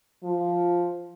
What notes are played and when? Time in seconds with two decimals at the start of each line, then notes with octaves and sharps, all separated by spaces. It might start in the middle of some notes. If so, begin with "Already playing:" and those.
0.23 F3